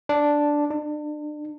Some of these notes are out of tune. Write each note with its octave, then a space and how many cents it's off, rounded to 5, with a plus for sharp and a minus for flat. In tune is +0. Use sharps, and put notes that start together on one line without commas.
D4 +0
D4 +35